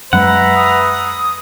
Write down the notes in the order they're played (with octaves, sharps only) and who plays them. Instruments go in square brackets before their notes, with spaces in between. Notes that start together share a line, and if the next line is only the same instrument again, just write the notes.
[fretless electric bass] F#2 F#3 G#3 [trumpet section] B4 E5 A#5 [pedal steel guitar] F#5
[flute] D#6